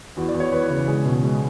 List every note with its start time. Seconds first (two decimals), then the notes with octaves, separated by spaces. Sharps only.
0.17 E2 F#4
0.29 D5
0.35 E2
0.40 C#5
0.52 E2 B4
0.70 C#3
0.88 G#3 G#4
1.05 B2
1.23 G#3